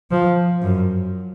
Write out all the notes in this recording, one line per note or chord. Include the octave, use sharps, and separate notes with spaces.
F3
F#2